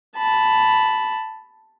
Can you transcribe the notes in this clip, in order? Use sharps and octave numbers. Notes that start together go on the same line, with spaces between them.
A5 B5